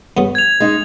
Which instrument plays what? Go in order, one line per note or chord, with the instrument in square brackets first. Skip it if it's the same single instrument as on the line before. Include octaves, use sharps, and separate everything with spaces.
[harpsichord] G2 C#3 B3
[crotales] G#6 F7
[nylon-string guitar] G#3 D#4